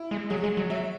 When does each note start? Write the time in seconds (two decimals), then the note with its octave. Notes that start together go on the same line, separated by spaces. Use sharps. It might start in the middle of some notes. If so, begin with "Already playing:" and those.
Already playing: E4
0.11 G#3
0.30 F#3 G#4
0.44 G#3
0.57 F#3
0.70 F#3 E5